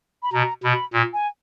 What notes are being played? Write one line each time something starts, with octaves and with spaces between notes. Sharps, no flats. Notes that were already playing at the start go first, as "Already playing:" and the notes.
B5
B2 A#5
B2 B5
A#2
G#5